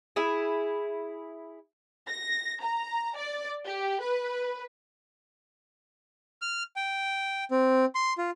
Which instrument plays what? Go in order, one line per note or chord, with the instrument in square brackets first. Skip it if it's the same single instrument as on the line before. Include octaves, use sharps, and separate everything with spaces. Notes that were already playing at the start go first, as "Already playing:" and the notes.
[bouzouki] E4 G#4
[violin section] A#6
A#5
D5
G4
B4
[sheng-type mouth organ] F6
G5
C4
C6
F4